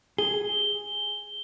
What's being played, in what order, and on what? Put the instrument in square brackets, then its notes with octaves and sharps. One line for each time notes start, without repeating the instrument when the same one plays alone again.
[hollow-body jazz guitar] G#4 [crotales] G7